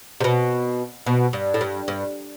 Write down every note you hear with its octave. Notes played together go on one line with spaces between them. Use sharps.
C3
B2
B2
G2
A2
G2
G2